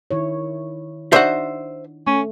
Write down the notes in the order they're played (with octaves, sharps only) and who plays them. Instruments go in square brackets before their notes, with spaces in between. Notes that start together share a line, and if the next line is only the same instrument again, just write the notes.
[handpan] D#3 E4 C#5
[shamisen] D4 D#4 F#4 [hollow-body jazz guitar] C5 E5
[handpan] A3 [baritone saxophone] C#4